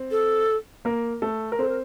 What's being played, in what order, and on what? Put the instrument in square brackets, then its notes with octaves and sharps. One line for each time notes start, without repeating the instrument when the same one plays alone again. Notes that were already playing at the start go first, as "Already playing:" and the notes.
Already playing: [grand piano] C4
[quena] A4
[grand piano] A#3 A#4
A3 A4
A#4
[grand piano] C4 C5 [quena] A4
[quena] A#4